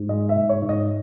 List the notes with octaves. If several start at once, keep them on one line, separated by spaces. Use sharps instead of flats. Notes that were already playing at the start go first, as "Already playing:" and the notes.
Already playing: G#2
G#3 D#5
E5
G#2
C#5
G#2
D#5